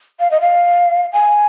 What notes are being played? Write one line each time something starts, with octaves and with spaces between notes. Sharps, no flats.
F5
D#5
F5
G#5